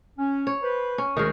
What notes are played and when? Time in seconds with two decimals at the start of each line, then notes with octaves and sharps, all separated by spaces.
0.19 C#4
0.47 C#5
0.62 B4 C5
0.98 C#4
1.17 D2 D#3 G#3 A#4